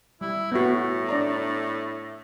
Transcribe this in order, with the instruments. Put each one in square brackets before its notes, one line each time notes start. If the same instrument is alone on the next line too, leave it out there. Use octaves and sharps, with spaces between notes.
[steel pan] G3 [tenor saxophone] E4
[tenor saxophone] A2 [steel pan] B3 F#4
[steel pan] D4 D5 A#5